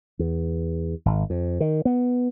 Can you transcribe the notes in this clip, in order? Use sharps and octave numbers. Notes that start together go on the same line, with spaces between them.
E2
G#1
F2
D#3
B3